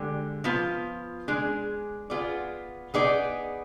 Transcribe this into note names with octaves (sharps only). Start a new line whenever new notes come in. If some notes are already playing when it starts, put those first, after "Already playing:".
Already playing: D3 G#3 G4 D5
F3 B3 F4
G#3 D4 G#4
B3 F4 G#4 D5
B3 D#4 G#4 D5